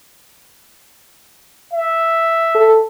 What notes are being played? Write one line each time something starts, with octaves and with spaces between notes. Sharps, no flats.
E5
A4